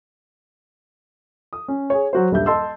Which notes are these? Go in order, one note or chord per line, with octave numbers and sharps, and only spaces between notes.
D#6
C#4
G#4 C#5
F#3 F#4 C5
D#1 G2 E5 G6
D#5 A5 C6 E6